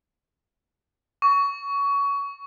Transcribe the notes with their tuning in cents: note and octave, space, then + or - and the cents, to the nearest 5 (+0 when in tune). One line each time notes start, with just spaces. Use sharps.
C#6 +20